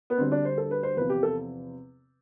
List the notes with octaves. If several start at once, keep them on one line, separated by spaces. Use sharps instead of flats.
B3
D2 D3 G3 C4
D4
C5
A4
B4
C5
E2 C3 F3 B4
G4
A4